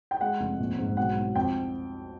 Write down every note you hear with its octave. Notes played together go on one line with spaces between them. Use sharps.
G5
G#3 F#5
F1
A#1
G#2
B1 F#5
B1
F2 G5